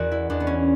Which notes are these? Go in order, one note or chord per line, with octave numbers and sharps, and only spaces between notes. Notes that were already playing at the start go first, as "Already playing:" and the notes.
Already playing: E2 F#4 A#4 D5
E4
E2 D4
B3
C#4